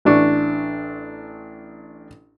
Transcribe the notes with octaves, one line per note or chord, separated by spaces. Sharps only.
A1 D4 C#6